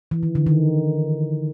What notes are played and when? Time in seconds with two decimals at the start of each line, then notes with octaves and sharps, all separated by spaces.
0.11 E3
0.23 D#3
0.35 D3
0.46 D#3